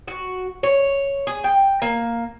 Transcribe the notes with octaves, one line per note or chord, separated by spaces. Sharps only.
F#4
C#5
G#4
G5
A#3